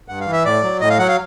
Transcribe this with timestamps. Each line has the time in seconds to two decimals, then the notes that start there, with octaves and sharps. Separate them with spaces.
0.08 G2 F#5
0.20 F5
0.26 E3
0.33 E5
0.45 A2 D5
0.63 F#3
0.81 A2 D#5
0.90 F5
0.99 F#3 F#5
1.08 F5